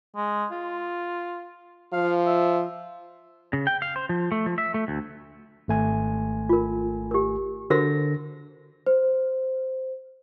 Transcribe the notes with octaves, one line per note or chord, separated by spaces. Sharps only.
G#3
F4
F3 F5
E5
C#3
G5
F5
C5
F3
A3
F3
E5
A3
D2
G#1 A3 G#5
F4 A#4
G4 A#4
D3 F#4 A#4 C5 A#6
C5